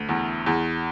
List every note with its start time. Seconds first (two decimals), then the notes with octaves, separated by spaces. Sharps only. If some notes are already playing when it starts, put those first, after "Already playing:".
Already playing: D2
0.09 E2
0.46 E2